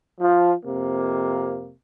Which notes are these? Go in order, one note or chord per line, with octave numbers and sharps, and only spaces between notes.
F3
F2 C3 A#3